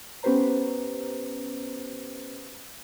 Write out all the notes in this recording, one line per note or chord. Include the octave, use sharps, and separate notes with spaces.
B3 C#4 G4 B4 C5 A#5